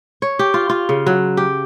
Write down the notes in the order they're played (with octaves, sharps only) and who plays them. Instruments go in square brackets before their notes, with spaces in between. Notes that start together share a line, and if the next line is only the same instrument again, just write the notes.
[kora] C#5
G4
F4
F4
C#3
F#3
G4